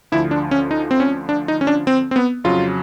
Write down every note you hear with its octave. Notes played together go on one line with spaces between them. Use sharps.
D2 D3 F3 E4
D4
C#4
D#4
C4
C#4
D4
D#4
C#4
D4
C4
C4
B3
F2 C#3 F#3 F4